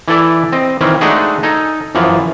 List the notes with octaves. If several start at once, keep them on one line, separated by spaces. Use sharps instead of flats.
E3 E4 A4 D5
C4 D#5
D#3 E3 C4 C#4
G#3 A3 D4 D#4 F#4 G#4
D#4 A4 G#5
F#2 E3 F3